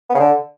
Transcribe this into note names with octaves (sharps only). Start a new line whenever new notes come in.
B3
C#3
D3